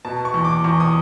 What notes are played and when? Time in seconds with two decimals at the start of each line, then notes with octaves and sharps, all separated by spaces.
0.05 B2 A5
0.25 C#6
0.34 E2
0.45 D6
0.64 E2 C#6
0.80 D#6